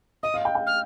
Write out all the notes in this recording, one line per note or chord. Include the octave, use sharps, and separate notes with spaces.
D#5 D#6
F5
G5
G5
F6